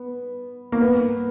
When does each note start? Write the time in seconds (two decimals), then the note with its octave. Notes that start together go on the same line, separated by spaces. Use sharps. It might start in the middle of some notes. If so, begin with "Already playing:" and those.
Already playing: B3
0.72 A#3
0.81 B3